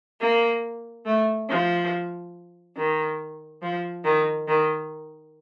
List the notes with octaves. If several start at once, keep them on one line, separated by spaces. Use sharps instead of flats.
A#3
A3
F3
D#3
F3
D#3
D#3